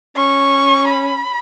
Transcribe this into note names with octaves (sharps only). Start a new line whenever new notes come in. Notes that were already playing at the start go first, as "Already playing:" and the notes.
C#4 C#6
B5